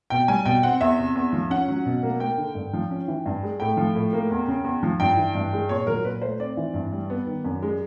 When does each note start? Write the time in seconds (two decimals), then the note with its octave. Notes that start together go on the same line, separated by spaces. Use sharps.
0.10 B2 G5
0.28 G3 G#5
0.46 B2 G5
0.63 C4 F#5
0.81 E2 E5
0.98 C3
1.15 E2
1.33 F3
1.50 C#4 F#5
1.68 F#3
1.86 B2
2.03 A#3
2.20 A#3 G5
2.37 D3
2.55 G2
2.73 F3
2.91 C#4
3.08 E3
3.26 G2
3.43 G#3
3.60 A2 G5
3.77 F3
3.95 A2
4.13 A#3
4.31 E2
4.47 C#3
4.64 E2
4.83 F3
5.00 G2 G5
5.17 E3
5.35 G2
5.53 G#3
5.69 A#2 C#5
5.87 F#3 A#4
6.05 A#2 B4
6.22 A3 C5
6.40 C4 D5
6.57 E3
6.74 G2
6.92 G3
7.10 B3
7.26 D#3
7.45 F#2
7.62 G#3